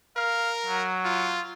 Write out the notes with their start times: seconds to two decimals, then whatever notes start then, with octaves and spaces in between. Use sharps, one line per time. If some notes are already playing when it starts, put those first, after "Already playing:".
0.17 A#4 F5
0.66 F#3
1.04 F4